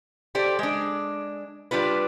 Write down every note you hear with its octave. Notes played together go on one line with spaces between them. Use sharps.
G4 A4 C5 D5
G#3 D4
G3 D4 F4 B4